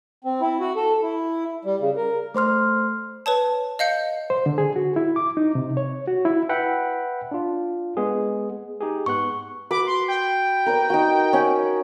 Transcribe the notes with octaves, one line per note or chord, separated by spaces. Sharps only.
C4
E4
F#4
A4
E4
G3
C#3
A#4
A3 C5 C6 F6
B4 C#5 A5
D#5 F5 G6 C#7
C5
D3
G#4
F#4
E4
D6
D#4
C3
C#5
F#4
E4
B4 E5 F#5 G5 B5
D4 F4
G#3 B3 G#4
D#4 G4 G#4
G#2 B3 C#6 F#6
F#4 B4 D6
C6
G5
A#4 B4 D5
D#4 F#4
C#4 F#5